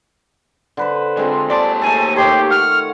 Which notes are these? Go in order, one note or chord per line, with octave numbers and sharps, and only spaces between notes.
D3 B4 C5
D3 G#3 C4 F4
D#2 D5 A5
A3 D#4 A4 G#5
D#3 G4 C#5 C6
F#5 F6